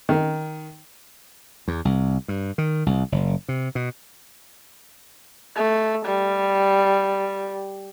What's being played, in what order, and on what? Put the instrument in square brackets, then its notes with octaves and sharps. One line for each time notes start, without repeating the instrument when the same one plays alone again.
[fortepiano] D#3
[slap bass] E2
C2
G2
D#3
C2
F#1
C3
B2
[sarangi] A3
G3